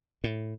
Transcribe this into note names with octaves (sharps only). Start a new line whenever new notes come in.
A2